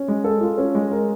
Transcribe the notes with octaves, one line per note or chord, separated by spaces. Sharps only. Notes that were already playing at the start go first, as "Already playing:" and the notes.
Already playing: C#4
G#3
A4
F4
C#4
G#3
A#4